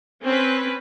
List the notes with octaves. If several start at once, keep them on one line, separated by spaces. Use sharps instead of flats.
C4 C#4 B4